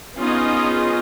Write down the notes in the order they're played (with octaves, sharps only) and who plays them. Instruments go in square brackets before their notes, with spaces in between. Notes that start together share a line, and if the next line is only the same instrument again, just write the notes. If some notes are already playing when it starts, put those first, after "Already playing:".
[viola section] B3 C#4 D#4 F4 G#4 D#5